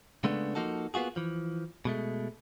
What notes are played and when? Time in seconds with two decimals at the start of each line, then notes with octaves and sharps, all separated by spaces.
0.24 C#3 G#3 A3 B3 D4
0.55 F3 F#3 A#3 D#4 F#4 A4
0.94 A#3 B3 F4 F#4 G#4
1.16 E3 F3
1.85 B2 G#3 A3